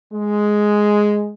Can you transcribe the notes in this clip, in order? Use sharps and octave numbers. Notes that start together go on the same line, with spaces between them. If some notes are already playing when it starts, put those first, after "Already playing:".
G#3